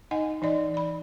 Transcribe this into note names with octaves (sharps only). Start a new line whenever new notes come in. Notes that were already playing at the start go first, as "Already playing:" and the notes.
D#4 D#5 F#5 G#5
E3 D#4 D5 D#5
D5 B5